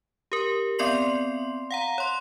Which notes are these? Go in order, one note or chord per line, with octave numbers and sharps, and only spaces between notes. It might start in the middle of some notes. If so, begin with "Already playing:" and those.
G4 A#4
B3 C4 D5 C6 C7 F#7
F5 F#5 A#5
C#5 C6